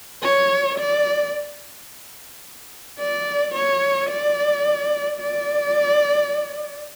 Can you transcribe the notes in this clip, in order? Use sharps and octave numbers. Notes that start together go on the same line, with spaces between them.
C#5
D5
D5
C#5
D5
D5